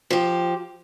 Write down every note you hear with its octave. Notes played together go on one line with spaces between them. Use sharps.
F3 G4